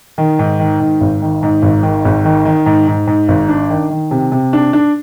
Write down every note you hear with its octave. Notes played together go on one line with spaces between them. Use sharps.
D#3
G#2
D#3
G#2
G#1
D#3
G#2
G#1
D#3
G#1
D#3
D#3
G#2
G#2
G#2
G#1
D4
D#3
D#3
C3
C3
D4
D4